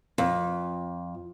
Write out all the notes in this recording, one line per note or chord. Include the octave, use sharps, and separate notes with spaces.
F2